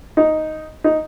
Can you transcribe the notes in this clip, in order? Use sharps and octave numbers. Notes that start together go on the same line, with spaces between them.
D#4
D#4